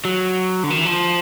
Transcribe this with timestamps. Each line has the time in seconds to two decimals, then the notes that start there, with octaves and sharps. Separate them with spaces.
0.05 F#3
0.63 D3
0.70 D#3
0.78 E3
0.85 F3